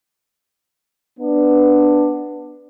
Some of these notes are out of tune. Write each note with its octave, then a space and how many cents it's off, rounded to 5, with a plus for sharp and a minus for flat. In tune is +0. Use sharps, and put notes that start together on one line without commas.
B3 +0 D4 +10